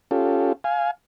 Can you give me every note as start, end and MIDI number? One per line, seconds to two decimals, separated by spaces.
0.11 0.53 61
0.11 0.53 65
0.11 0.53 67
0.11 0.53 69
0.64 0.91 77
0.64 0.91 80